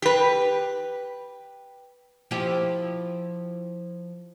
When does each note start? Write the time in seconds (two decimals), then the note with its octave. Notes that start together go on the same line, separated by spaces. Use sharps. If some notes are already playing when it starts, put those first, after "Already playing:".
0.02 G4 B4
2.31 F3 E4 G4